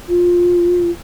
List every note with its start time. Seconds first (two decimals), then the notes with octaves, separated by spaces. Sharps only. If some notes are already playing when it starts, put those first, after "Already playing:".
0.09 F4